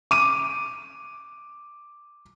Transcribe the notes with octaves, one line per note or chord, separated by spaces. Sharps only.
D6 D#7